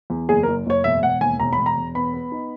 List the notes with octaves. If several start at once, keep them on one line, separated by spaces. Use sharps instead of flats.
E2
F#1 G#4
F#1 A#4
F#1 C#5
E1 E5
E1 F#5
D#2 G#5
E1 A#5
B5
E1
A#5
E1
B3 B5
B3
D#4